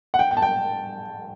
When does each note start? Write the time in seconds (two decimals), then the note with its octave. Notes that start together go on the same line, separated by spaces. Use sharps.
0.14 F#5
0.19 G5
0.31 G5
0.37 A5
0.42 G5